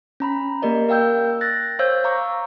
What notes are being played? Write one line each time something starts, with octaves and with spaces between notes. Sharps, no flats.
C#4 A#5 B5
A#3 G4 A#4 D5 D#5
A#4 F5 G5 E6 G6
F#6 A6 A#6
C5 C#5 F5 E6 G6 G#6
F5 A#5 C#6 D6